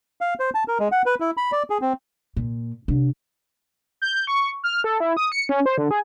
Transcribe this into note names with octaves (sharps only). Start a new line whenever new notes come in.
F5
C5
A5
A#4
G#3
F#5
B4
E4
B5
D5
G#4
C4
A#2
C3 D4
G6
C#6
F6
A4
E4
D#6
C#7
C#4
C5
D3
G#4